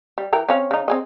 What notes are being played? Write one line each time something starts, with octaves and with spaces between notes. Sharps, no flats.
G3
E3 A#4 G5
C4 C#4 F5
C#3 D#4
C4 G#4 D#5